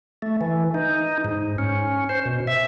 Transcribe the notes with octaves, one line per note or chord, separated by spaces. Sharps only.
A3
E3
D#4
G#2
C#4
C5
B2
E5